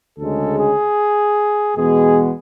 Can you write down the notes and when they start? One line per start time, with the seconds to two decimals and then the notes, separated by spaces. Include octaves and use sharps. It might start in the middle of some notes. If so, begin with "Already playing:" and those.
0.18 D2 C#3 G#3 A4
0.58 G#4
1.77 E2 B2 G#3 B3 G#4